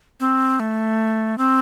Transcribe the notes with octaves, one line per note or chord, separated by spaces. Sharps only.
C4
A3
C4